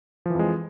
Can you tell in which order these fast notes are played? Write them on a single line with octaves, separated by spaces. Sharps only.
F3 E3 F2 G#3